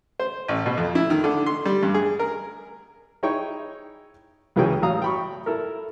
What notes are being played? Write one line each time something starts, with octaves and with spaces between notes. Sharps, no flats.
C5
A1
B2
F2
E4
D#3
D3
C6
G3
G2
G#4
A#4
D#4 E4 G#4 C#5 G5 C#6
C#2 C#3 E3 F#3 G#4 G5
A1 F#3 F5 A#5 D#6
G5 B5 C#6
E4 A4 A#4